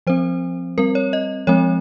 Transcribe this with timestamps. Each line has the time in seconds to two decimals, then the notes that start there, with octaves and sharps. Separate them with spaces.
0.07 F3 C4 C5
0.78 G3 C4 A#4
0.95 C#5
1.13 D#5
1.47 F3 G#3 C4 C#5